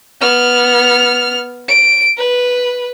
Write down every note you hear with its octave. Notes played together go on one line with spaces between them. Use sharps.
B3 F6
D7
B4